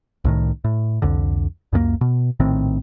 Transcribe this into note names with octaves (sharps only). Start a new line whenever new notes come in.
C2 A2 D#3
A2
C2 F2 D3
C#2 F#2 G#3 A#3
B2
A#1 A2 D#3 C4